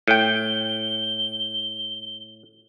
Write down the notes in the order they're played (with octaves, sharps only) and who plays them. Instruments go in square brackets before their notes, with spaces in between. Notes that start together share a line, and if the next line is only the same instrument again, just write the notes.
[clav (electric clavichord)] A2 G5 [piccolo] G7